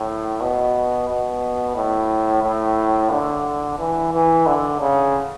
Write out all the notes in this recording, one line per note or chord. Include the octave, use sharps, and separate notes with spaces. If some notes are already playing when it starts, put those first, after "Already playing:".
Already playing: A2
B2
B2
A2
A2
D3
E3
E3
D3
C#3